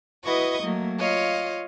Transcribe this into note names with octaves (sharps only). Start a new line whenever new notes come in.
E4 F#4 B4 D#5 C#6 D#6
F#3 A3 A#3
F4 C#5 D#5 F5